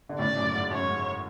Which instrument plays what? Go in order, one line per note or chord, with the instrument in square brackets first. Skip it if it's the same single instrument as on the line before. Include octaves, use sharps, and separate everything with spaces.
[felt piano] D3
[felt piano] A2 C#3 [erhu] D5
[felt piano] F#2 A2
G#2
[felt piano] F#2 [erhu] C#5
[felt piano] G#2